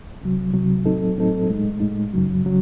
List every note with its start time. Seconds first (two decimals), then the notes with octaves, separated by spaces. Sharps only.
0.22 C2 C3 F#3
0.53 C2 C3 F#3
0.85 A2 F#3 C4 D#4 A4
1.16 A2 F#3 C4 D#4 A4
1.49 A2 G#3 D#4
1.80 A2 G#3 D#4
2.13 F#2 C#3 F#3
2.45 C#3 F#3